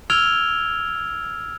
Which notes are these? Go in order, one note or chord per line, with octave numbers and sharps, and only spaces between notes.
E6 F6 G#6 D7 F7 G7